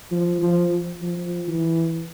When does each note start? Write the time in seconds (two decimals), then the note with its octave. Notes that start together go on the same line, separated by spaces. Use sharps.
0.12 F3
0.42 F3
1.02 F3
1.48 E3